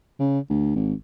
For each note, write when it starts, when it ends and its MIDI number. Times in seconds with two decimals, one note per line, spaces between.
0.19 0.39 49
0.50 0.75 38
0.76 0.93 32